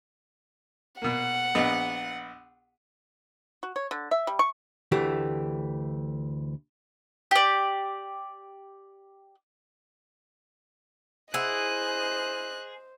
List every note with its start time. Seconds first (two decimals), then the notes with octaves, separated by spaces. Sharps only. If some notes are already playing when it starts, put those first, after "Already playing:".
1.02 B2 A#3 F#5
1.55 A#1 B3 D#5
3.63 F#4
3.76 C#5
3.91 D3
4.11 E5
4.27 G3
4.39 C#6
4.92 D2 E3 A3 G4
7.31 G4 D5
11.34 E4 G#4 C5 D#5 F#5 F#6